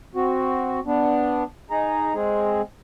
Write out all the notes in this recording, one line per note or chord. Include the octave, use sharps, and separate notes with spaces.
C4 F#4
B3 D4
D#4 G#4 A#5
G#3 C4 G#4